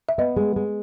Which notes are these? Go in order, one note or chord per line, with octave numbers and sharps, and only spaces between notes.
E5
B3 D#5
G#3
G#3